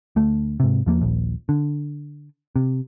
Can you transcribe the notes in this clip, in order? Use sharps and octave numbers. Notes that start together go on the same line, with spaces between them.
D2 A3
G#2 C3
E2 F3 A#3
D#1 A#1
D3
C3